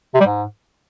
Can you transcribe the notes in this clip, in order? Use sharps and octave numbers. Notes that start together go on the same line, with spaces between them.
C3
G3
G#2